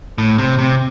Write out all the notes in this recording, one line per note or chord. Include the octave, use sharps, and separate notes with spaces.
A2
C3
C3